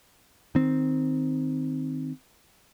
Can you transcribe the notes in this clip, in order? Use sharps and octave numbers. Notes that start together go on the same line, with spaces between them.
D#3 C4